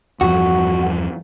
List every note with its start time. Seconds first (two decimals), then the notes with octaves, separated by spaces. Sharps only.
0.21 E2 G2 F3 F#4